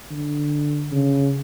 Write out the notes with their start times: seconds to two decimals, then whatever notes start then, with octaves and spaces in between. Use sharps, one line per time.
0.11 D3
0.92 C#3